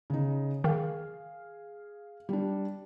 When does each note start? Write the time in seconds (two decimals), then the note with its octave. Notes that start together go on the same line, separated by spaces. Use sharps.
0.10 C#3 D#4
0.64 D#3 G#4 F5
2.29 G3 D4